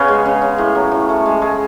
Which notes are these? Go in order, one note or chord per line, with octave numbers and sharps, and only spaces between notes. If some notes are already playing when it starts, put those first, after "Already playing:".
Already playing: C#3 B3 C#4
G#3
C#3
C#3
A2
F#3
A2
A3
G#3
G#3